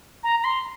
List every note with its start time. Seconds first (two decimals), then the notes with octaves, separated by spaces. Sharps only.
0.24 A#5
0.40 A#5
0.44 C6